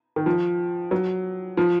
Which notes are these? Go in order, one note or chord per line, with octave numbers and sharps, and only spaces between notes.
D#3
F3
F#3
F3